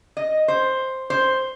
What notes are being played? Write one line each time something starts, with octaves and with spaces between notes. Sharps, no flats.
D#5
C5
C5